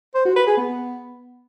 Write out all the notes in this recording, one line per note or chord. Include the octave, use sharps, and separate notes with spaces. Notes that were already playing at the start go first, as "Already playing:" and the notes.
C5
F#4
B4
G#4
B3